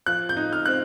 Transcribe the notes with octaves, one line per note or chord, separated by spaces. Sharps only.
F3 F#6
G6
D#4
F6
C4 F#6